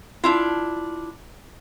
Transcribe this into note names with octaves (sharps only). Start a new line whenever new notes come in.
D4 E4 F4